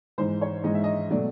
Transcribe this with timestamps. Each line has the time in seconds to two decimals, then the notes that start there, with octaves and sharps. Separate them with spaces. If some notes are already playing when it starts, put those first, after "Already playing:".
0.18 G#2 E3 G#3 C5
0.41 C#5
0.64 G#2 E3 G#3 D#5
0.75 E5
0.84 D#5
1.10 B2 F#3 A3 D5